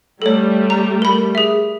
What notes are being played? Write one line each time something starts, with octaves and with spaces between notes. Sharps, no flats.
G3 A3 A4 C#5
A#5
A#4 B5
G#4 E5